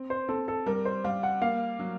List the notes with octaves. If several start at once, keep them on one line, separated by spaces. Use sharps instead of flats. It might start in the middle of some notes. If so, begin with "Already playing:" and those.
Already playing: C4
C5
C4 A4
A4
G3 A#4
C5
G3 F5
F#5
A#3 F5
F#3